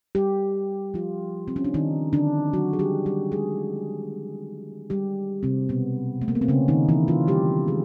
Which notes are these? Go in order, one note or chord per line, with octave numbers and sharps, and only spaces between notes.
G3 G4
F3 F4
C4
C#4
D4
D#3 D#4
D3 D4
F#3 F#4
G#4
G3 G4
G3 G4
G#3 G#4
G3 G4
C3 C4
B2 B3
A3
A#3
B3
C4
C#3 C#4
D#3 D#4
E3 E4
F3 F4
G3 G4
G#3 G#4